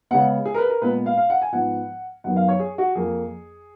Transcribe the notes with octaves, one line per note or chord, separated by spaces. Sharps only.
C#3 G#3 B3 F#5
G#4
A#4
B4
A#4
A#2 G#3 B3 B4
F5
F5
F#5
G#5
G#2 F3 B3 F#5
F#2 D#3 F#3 B3 F#5
F5
C#5
G#4
F#4
F2 F3 A#3 G#4